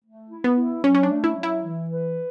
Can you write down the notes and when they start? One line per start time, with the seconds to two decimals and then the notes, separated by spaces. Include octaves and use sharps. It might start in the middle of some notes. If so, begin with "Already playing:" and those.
0.04 A3
0.30 E4
0.44 B3
0.57 E4
0.84 F#3 C#4
0.95 C#4
1.03 D4
1.10 A3
1.24 E4
1.36 F#3
1.43 E4
1.63 E3
1.90 B4